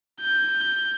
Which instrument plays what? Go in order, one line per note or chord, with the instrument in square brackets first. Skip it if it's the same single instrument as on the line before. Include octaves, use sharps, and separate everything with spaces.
[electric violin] G6